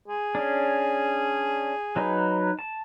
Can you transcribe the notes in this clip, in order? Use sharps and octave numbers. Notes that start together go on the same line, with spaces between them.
G#4
C#4 D4
F#3 D#4 B4
A5